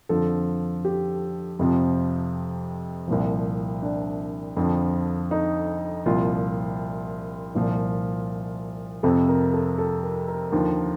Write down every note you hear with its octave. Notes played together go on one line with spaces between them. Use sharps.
F2 D3 F3 A4
G4
F2 C3 F3
C2 A#2 F3
D4
F2 D3 F3
D#4
C2 A#2 F3 F4
C2 A#2 F3
F2 C3 F3 A4
A#4
A4
A4
A#4
A#4
D#2 D3 F3